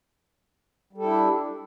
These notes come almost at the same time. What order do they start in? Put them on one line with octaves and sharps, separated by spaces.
G3 A4 E4 D4